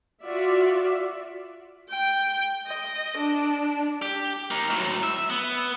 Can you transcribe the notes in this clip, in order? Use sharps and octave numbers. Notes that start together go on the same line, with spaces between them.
F4 F#4 D5 E5
G5
D#5
D4
G4
A#3 D#4
A2 F#3
E5
B3